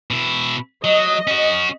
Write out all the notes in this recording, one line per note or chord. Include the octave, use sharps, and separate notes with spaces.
B2 E4
F#3 D#5
C#4 F#4